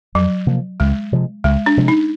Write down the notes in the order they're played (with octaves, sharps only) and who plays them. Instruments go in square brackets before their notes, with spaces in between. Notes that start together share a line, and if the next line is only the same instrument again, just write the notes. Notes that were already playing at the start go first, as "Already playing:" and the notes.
[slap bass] F2 [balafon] F#3
[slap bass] C3 F3 A#3
[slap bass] C#2 [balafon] G#3
[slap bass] C3 F3 G#3
[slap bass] C#2 [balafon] G#3
[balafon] D4
[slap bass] C3 F3 G#3
[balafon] D#4